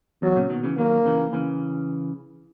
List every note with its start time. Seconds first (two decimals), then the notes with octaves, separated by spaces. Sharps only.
0.22 E2 F#3
0.36 A#2 C#3
0.50 B2 D#3
0.64 C#3 E3
0.78 D#3 F#3 A#3
1.05 C#3 E3
1.33 C#3 E3